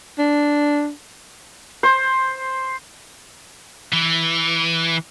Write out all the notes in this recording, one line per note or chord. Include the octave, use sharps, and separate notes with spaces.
D4
C5
E3